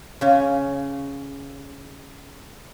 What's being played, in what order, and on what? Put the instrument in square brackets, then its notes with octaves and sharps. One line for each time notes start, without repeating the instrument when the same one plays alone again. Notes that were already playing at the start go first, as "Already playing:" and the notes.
[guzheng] C#3 C#4